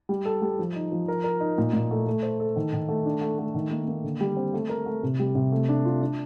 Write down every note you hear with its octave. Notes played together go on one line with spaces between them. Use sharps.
G3
A4
G3
F3
D#4
F3
A#4
A#4
D#4
A#2
A#2
A3
A3
C5
A4
D#3
D#3
A3
D4
A3
A3
D#3
A#3
A#3
D3
G3
C4
A3
A#4
A3
C3
G3
C3
A3
D4
F4
D4